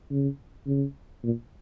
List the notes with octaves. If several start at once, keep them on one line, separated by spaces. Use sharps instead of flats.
C#3
C#3
A#2